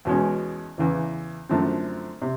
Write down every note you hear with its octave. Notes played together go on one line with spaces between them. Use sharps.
E2 B2 G#3 C#4
E2 C#3 E3
F#2 D3 F3 A3 C4
C3